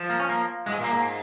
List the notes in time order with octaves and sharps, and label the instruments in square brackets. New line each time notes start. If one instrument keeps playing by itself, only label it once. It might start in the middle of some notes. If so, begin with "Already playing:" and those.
Already playing: [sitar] F3
[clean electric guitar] A#3
C#4
A#3
[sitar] G#2 [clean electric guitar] G#3
[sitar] A#2
[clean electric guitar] A#3
[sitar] G#2